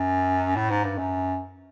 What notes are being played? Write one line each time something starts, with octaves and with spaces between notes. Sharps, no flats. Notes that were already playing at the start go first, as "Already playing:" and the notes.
Already playing: F#2
A2
G#2
G2
F#2